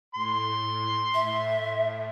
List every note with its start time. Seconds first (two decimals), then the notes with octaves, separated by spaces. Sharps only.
0.15 A2 C6
1.14 A2 E5